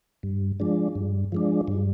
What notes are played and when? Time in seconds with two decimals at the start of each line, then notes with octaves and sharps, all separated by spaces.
0.23 G2
0.60 F3 G#3 D4
0.95 G2
1.32 F3 G#3 D4
1.68 G2